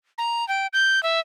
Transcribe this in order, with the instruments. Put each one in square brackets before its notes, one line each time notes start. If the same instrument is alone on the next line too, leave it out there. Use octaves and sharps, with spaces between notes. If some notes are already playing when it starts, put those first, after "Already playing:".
[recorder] A#5
G5
G6
E5